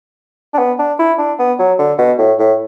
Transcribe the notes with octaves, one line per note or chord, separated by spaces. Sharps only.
D4
B3
D4
E4
D4
B3
F#3
D3
B2
A2
A2